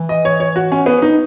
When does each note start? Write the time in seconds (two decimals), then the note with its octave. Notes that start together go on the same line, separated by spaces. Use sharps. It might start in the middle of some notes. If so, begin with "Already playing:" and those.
Already playing: E3
0.09 D#5
0.25 C#5
0.40 C#5
0.56 F#4
0.72 C#4
0.86 B3
1.02 D#4